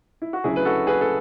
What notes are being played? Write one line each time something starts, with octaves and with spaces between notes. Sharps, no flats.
E4
F#4
D2 C#3 F#3 E4 G#4
B4
F#4 A4
G#4 B4
A4